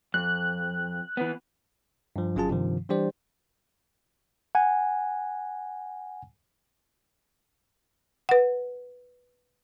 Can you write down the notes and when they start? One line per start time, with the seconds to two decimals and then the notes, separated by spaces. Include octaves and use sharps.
0.14 F2 F#6
1.17 E3 B3
2.16 G2 F3
2.36 G1 F#3 C#4 F4 G#4 A5
2.49 G2 C3 D#3 F3
2.89 E3 G3 D4 G4 C5 D5
4.55 F#5 G#5
8.29 B4 F#5